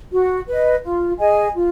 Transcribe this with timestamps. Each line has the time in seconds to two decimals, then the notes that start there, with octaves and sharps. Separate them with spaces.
0.11 F#4
0.47 B4 D#5
0.82 F4
1.19 G#4 D#5 G#5
1.55 F4